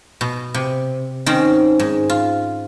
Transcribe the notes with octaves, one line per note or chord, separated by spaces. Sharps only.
B2
C3
D#3 C4 C#4
G#2
F4